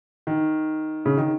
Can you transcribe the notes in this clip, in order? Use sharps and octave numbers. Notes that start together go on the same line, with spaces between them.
D#3
C#3
D#3